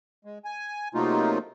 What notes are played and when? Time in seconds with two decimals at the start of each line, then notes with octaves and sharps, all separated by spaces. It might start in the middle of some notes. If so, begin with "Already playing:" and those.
0.25 G#3
0.45 G#5
0.94 C3 F#3 A3 A#3 D#4 F4